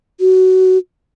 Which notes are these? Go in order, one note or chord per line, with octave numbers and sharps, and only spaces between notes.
F#4